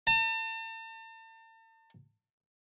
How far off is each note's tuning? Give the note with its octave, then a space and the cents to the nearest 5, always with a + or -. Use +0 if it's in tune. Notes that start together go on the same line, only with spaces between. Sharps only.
A5 +40